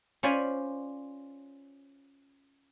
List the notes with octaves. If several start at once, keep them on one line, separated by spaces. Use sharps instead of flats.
C#4 F4 C5 D5 G#5 B5